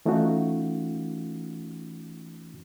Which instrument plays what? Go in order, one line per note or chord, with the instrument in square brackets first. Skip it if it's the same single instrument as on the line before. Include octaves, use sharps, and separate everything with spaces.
[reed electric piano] E3 A3 C#4 D#4 F4 F#4